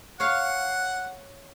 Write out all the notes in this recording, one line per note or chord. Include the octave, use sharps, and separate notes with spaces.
C#5 F5 F#5